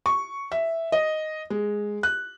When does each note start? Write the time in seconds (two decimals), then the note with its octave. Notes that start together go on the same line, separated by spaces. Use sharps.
0.06 C#6
0.52 E5
0.92 D#5
1.50 G#3
2.03 F#6